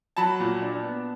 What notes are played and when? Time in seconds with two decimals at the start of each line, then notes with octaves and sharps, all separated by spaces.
0.17 F#3 A5 B5
0.40 A#2
0.62 D4
0.83 B3